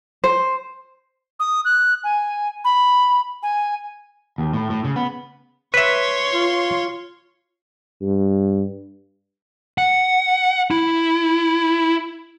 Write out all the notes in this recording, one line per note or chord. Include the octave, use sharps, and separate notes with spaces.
C5
D#6
F#6
G#5
B5
G#5
D#2
A2
A2
C#3
B3
B4 C#5 E5 C6
F4
G2
F#5
E4